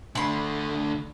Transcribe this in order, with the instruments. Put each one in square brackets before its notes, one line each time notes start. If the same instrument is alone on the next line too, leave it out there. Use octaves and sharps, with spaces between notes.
[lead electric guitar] D3 A3 [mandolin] B5 C6